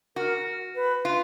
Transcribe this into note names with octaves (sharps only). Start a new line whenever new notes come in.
F#4 A#4
B4
F4